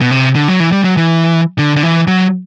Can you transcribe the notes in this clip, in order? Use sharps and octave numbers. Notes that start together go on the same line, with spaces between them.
B2
C3
D3
F#3
E3
G3
F#3
E3
D3
D3
E3
F#3